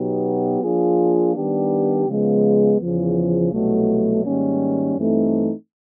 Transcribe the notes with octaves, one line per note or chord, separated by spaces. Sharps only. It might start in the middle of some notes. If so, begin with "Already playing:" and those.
Already playing: B2 F#3 B3 D#4 G4
F3 A#3 D4 F4 G#4
D#3 G3 B3 D4 G4
C#3 F3 G#3 B3
E2 C#3 F3
C2 B2 F#3 A3
G#2 D#3 G3 A#3 C#4
G2 E3 A3 C4 D#4